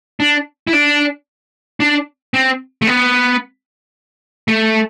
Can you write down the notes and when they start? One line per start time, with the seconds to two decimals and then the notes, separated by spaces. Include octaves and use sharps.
0.20 D4
0.67 E4
0.73 D4
1.80 D4
2.34 C4
2.82 A3
2.87 B3
4.48 A3